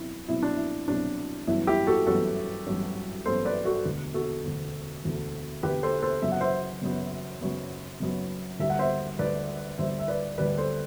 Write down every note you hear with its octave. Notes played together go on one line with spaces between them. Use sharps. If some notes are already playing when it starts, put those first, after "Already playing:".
Already playing: C2 B2 F#3 E4
C2 B2 F#3 E4
D4
E4
C2 B2 F#3 D4
A1 G2 F#3 B3 E4
E4 G4
F#4 A4
A1 G2 F#3 B3 F#4 A4
A1 G2 F#3 B3
A1 G2 F#3 B3 A4 C5
B4 D5
F#4 A4
E1 D2 D3 A3
F#4 A4
E1 D2 D3 A3
E1 D2 D3 A3
E1 D2 D3 A3 G4 B4
A4 C5
A4 C5
F#1 F#2 F#3 B3 E5
F#5
C5 E5
F#1 F#2 F#3 B3
F#1 F#2 F#3 B3
F#1 F#2 F#3 B3
D2 D3 G3 E5
F#5
C5 E5
D2 D3 G3 B4 D5
D2 D3 G3 C5 E5
E5
B4 D5
D2 D3 G3 B4 D5
A4 C5